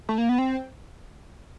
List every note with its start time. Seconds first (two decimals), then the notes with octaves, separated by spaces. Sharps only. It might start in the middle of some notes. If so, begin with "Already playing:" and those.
0.09 A3
0.18 A#3
0.29 B3
0.38 C4